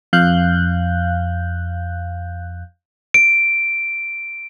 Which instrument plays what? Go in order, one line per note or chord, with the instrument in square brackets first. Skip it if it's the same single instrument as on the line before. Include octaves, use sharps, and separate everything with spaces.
[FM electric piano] F2 F5 F#6 G6
[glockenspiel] D7